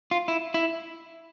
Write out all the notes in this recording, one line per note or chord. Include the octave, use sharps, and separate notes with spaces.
F4
E4
E4